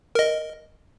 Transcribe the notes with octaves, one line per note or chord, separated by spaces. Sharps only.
A#4 D#5